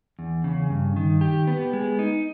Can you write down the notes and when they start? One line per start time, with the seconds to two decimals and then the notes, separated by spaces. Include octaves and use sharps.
0.19 E2
0.44 C#3
0.70 G2
0.96 D#3
1.21 G4
1.47 B3
1.73 G#3
1.99 D#4